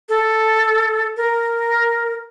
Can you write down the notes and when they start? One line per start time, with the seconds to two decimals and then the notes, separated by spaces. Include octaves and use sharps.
0.09 A4
1.17 A#4